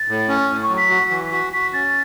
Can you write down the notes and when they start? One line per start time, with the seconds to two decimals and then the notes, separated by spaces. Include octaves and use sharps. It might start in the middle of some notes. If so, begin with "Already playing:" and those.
Already playing: A6
0.08 A2
0.28 C#4
0.49 A2
0.63 C#6
0.69 F#3
0.77 B6
0.90 F#4
1.11 E3
1.32 F#4 B6
1.53 F#4 B6
1.73 C#4 A6